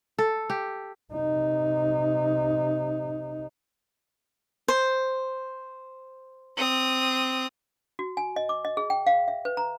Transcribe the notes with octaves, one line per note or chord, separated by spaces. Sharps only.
A4
G4
C3 D#4
C5
C4 D#6
F#4
G#5
D#5
D6
D#5
G#4
G5
F5
E5
B4
A#5